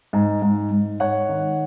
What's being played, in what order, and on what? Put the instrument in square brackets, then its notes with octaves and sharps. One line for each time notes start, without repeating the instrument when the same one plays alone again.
[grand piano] G#2
G#2
G#2
G#2 C#5 F#5
D#3